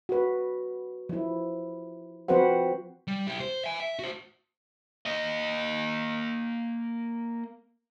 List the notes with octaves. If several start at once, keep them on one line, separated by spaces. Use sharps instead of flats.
F#4 B4
F3 E4
F3 C4 F#4 B4 C5 F#5
G3
E4 G4
C5
E5 G#5
E5
F#4 C5
A#3 D#5